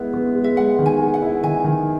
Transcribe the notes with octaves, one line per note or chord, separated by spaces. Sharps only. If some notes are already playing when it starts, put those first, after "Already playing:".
Already playing: G#3 B3 E4 F#5
B3
G#3
E5
G#3 F#5
D#3
G#5
G#3
F#5
E4
D#3 G#5
D#3